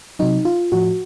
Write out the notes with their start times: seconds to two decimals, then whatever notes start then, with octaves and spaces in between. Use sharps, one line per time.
0.19 C3 F#3 D#4
0.45 F4
0.72 A2 F3 F#4